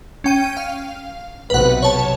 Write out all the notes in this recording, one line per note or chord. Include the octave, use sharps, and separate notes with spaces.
C#4 G5 D#7
F5
B1 C3 B4 F#5
C#5 A5